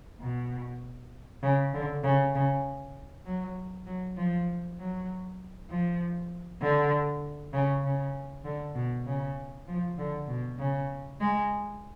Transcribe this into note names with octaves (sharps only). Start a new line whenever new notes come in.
B2
C#3
D3
C#3
C#3
F#3
F#3
F3
F#3
F3
D3
C#3
C#3
D3
B2
C#3
F3
D3
B2
C#3
G#3